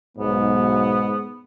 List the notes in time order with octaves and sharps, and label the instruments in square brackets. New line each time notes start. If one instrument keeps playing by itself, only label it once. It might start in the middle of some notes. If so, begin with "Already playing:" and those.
[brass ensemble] B1 [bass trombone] G#2 [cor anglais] B3